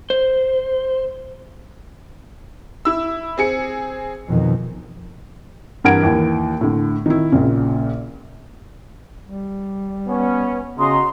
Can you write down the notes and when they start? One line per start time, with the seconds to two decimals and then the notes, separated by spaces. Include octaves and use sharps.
0.10 C5
2.85 E4 E6
3.38 C4 G#4 C#7
4.27 F2 B2 D#3
5.84 G2 E3 A#4 F#5 G#6 D7
6.03 D#2 E3
6.61 A2 D3
7.06 D#3 E4
7.32 A#1 A#2 C#3
9.23 G3
10.08 B3 C#4
10.79 C#3 F#4 D#5 A#5 C6